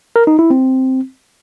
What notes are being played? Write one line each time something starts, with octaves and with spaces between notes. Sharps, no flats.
A#4
D#4
E4
C4